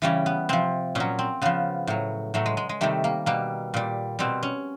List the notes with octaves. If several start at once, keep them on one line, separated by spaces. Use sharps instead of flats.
C#3 E3 G3 C#4
B3
C3 F3 C4
A#2 F#3 C#4
C4
C#3 F3 B3
A2 F#3
A2 F#3 A3
G#3
G#3
G#3
C3 D#3 G3 A3
A#3
B2 G3 A#3
A#2 G3
B2 G3 C4
C#4